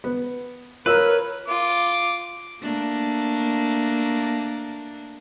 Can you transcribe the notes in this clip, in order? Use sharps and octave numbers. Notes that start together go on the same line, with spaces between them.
B3
F4 A#4 B4 C#5 E6
F4 D6
A3 A#3 D4